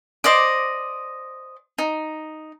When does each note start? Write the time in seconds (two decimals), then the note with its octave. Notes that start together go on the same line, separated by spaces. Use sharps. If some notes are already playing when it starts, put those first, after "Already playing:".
0.24 C5 D5 D#5 D6
1.78 D#4